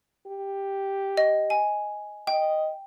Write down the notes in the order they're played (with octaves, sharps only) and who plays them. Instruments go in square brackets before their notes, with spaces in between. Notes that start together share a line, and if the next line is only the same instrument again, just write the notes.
[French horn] G4
[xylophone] D#5
G#5
[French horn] D#5 [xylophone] G5